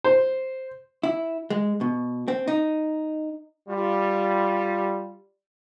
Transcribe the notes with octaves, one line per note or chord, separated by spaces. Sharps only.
C5
E4
G#3
B2
C4
D#4
G3 F4